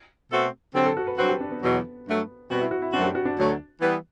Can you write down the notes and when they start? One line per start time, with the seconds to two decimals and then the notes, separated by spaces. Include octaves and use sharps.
0.31 B2 A3 C4 F#4 A4
0.74 D3 F#3 C4 G4
0.86 A4
0.97 F#4
1.07 B4
1.18 G2 F#3 C4 F#4 B4
1.29 G4
1.40 D4
1.51 B3
1.62 E2 B2 F#3
2.06 G2 F#3 A3
2.50 B2 G3 B3 C4 F#4
2.61 E4
2.71 F#4
2.82 E4
2.93 F#2 F#3 A3 C4 D4 F#4
3.04 G4
3.15 F#4
3.25 D4
3.37 D2 D3 F#3 A3
3.81 E3 G3 B3